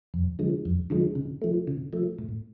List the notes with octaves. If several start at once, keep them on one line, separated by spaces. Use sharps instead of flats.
F2
D3 F3 G#3
F2
D3 F3 G#3
C#3
F3 A3
C#3
F3 A3
A2